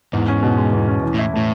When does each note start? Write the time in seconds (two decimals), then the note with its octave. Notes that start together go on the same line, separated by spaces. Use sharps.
0.13 E2 G#2
0.28 C#4
0.43 B2
0.58 G#3
0.73 E2
0.88 C#4
1.03 E3
1.14 A2 E4
1.33 A2 A3